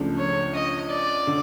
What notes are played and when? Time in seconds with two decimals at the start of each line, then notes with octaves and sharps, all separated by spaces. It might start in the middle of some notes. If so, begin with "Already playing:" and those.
Already playing: C#2 C#3 F3 A3 D4
0.18 C#5
0.54 D#5
0.89 D5
1.27 D3